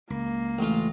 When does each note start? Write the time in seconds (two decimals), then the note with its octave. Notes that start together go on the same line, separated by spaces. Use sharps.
0.10 C#2 A#3
0.59 A1 F4